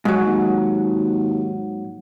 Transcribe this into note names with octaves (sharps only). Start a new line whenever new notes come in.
G#2 F#3
D#2